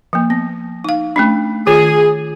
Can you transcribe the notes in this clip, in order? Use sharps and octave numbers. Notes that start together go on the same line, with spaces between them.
F3 A#3
B3
D#4 F5
A3 C#4 D4
D#3 F4 G#4